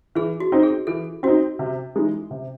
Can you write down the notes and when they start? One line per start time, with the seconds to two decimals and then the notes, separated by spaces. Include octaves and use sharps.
0.15 E3 G#4
0.40 F#4
0.52 C4 D#4
0.63 G#4
0.87 E3 A4
1.23 C4 D#4 F#4
1.59 C3
1.95 E3 G#3 D#4
2.31 C3